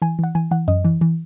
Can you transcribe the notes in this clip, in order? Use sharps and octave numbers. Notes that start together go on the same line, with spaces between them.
E3 G#5
E3 F#5
E3 G#5
E3 F#5
F#2 D#5
E3
E3